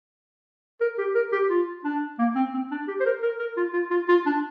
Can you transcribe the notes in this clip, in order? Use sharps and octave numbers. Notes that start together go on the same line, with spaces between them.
A#4
G4
A#4
G4
F4
D4
A#3
C4
C4
D4
G4
C5
A#4
A#4
A#4
F4
F4
F4
F4
D4